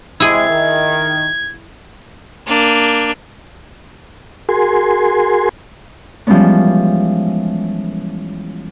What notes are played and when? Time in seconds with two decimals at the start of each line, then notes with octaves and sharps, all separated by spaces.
0.20 C3 G#3 E4 G#4 G#6
0.50 D#3
2.47 A#3 D4
4.49 F#4 G#4 A#4 G#5 C6
6.27 E3 F3 G3 G#3 B3 C#4